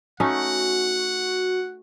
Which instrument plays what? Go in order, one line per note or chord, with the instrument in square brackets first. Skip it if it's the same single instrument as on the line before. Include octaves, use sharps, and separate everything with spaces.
[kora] A3 C#4 D#4 [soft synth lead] F#4 [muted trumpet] F#5